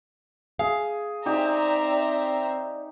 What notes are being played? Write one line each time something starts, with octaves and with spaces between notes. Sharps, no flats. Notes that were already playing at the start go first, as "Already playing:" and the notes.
G#4 F5
C4 D#4 G4 D5 E5 A#5